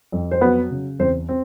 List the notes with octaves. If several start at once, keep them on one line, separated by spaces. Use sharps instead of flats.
F2
C5
F#3 B3 B4
C#3
E2 C4 C5
C4